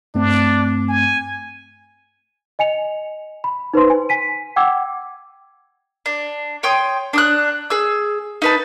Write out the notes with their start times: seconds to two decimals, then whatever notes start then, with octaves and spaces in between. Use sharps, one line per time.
0.15 G2 A3 C4 D4
0.89 G#5
2.59 D#5 G#5 C#7 F7
3.44 B5
3.74 D#4 B4 C5 C6
3.90 G#5
4.09 G#5 B6 D#7
4.56 F#5 G5 D6 E6 G#6
6.06 D4
6.63 C#5 G5 C6 D#6
7.13 D4 D#6 F#6
7.70 G#4 E6
8.42 D#4 B4 A5